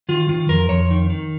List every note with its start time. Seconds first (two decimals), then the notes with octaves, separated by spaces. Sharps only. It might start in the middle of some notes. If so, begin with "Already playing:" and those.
0.09 D#3 F4
0.29 D#3 F4
0.49 F2 A#4
0.69 F2 C#5
0.90 D#3
1.10 D#3